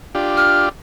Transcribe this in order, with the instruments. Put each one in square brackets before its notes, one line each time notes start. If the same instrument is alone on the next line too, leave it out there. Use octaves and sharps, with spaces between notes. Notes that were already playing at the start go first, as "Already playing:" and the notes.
[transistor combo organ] D4 F4 G4
[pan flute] F6